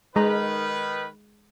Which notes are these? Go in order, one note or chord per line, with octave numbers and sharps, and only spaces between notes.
D#3 G#3 B4 A#5